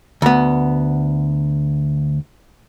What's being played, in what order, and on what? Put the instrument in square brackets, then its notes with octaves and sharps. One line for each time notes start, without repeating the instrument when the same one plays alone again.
[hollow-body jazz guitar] D2 B3